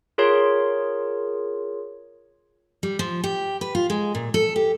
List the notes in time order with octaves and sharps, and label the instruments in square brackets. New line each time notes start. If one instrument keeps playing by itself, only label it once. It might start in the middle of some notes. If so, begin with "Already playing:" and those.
[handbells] F4 G#4 A#4 C#5 C6
[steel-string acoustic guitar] G3
F3
G4
B4
F4
G#3
A#2
A4
G4